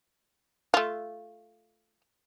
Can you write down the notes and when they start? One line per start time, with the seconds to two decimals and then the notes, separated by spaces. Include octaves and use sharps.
0.74 A3 F4